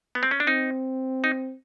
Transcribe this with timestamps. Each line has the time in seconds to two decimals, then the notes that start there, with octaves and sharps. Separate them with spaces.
0.15 B3
0.23 C4
0.31 C#4
0.40 D4
0.47 C4 D#4
1.24 D#4